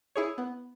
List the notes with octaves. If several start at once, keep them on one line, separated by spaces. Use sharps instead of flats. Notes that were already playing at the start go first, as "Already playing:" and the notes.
E4 G#4 C#5
B3